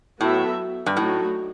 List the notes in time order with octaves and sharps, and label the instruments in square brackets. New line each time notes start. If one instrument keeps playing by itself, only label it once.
[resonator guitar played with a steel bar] A2 [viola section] F#3 B3 F#4 A4 E5
[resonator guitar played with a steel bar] G2
[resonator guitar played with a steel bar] A2 [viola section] F#3 A3 D#4 F#4